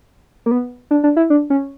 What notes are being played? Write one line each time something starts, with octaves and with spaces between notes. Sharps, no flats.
A#3
B3
D4
D4
E4
D4
C#4